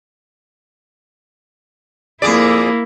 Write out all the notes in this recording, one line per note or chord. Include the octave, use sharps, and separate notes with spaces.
F2 A#3 E4 G#4 D5